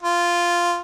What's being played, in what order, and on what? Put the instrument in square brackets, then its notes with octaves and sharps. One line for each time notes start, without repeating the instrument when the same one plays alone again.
[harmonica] F4